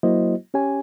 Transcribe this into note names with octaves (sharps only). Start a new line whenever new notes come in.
F#3 A#3 E4 F#4 C5 D#5
C#4 G4 C#5 G#5